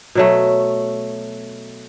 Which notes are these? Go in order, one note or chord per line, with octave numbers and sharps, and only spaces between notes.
B2 F#3 A3